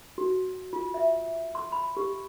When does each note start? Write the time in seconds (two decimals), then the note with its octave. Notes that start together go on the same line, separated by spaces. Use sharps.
0.18 F#4
0.73 F4
0.94 E5
1.55 C6
1.72 B5
1.97 G4